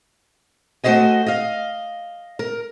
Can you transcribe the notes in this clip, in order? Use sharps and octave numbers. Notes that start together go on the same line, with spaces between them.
A3 F#4 G4 C5 D#5 G#5
D#5 F5
A#4